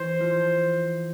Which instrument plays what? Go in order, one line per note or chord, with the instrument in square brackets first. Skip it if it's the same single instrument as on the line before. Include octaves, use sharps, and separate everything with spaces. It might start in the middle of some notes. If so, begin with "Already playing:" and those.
Already playing: [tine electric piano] E3 [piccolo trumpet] C5
[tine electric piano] F3